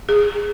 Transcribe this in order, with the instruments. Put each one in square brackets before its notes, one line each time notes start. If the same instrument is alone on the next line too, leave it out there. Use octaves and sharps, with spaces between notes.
[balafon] G#4